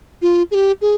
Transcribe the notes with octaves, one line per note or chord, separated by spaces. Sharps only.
F4
G#4
G4
G#4